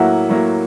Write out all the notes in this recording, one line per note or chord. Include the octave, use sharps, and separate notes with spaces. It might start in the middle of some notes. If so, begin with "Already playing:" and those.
Already playing: A2 F#3 A#3 E5 F#5
A2 F#3 A#3